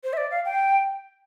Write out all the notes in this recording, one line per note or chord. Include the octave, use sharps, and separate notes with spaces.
C5
E5
D5
F5
G5